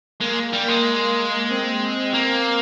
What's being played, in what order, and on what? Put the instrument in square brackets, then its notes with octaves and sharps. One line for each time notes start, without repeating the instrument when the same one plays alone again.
[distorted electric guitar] G#3 [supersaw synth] A#3
[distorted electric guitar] G3
G#3
[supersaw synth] C4
C4
[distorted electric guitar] A#3